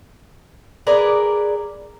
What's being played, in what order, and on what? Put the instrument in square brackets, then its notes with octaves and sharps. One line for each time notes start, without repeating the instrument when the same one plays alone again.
[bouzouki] G#4 A#4 B4 D5